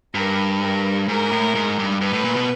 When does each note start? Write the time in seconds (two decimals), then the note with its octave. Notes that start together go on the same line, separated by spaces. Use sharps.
0.15 G2 A#4
0.61 A#4
1.08 G#2 A#4
1.32 A2
1.55 G#2
1.78 G2
2.01 G2 B4
2.13 A2
2.24 A#2
2.36 B2